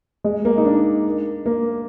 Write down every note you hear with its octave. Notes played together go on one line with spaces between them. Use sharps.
G#3
A#3
D#4
D4
A#3